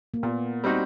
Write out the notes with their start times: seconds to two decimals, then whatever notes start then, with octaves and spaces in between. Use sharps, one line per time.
0.14 A#3
0.23 A#2 B3
0.64 G3 C4 D#4 F#4